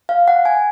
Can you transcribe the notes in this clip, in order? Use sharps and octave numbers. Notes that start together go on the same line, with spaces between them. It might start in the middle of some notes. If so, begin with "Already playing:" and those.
F5
F#5
G#5